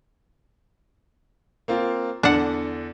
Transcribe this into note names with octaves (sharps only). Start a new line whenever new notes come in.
A#3 C4 F4
E2 D3 D4 F#5